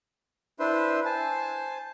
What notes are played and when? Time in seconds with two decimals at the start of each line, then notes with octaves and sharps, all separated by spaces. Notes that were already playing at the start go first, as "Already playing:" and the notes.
0.60 D4 E4 B4 C5 E5 C6
1.05 C5 G#5 A5